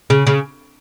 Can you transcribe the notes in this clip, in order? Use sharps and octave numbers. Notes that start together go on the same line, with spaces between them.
C#3
C#3